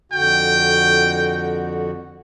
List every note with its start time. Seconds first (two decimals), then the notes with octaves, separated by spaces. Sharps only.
0.12 F2 D3 F#4 G5